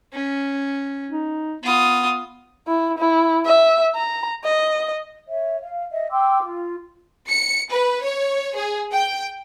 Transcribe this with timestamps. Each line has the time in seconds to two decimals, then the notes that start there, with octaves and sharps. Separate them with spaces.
0.13 C#4
1.09 D#4
1.63 B3 F4 D#6
2.67 E4
2.98 E4
3.45 E5
3.95 A#5
4.44 D#5
5.28 C#5 E5
5.62 F5
5.91 D#5 E5
6.10 G5 C6 D6 E6
6.43 F4
7.29 C#7
7.72 B4
8.03 C#5
8.56 G#4
8.93 G5